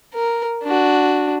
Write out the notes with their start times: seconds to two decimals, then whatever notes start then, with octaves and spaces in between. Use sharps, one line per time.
0.14 A#4
0.63 D4 F#4